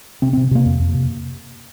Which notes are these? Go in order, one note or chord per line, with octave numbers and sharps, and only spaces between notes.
C3 C4
C3 C4
C3 A#3
F2
F2
C3